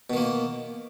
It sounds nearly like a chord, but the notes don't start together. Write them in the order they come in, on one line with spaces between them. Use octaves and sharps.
B2 D#3 A#3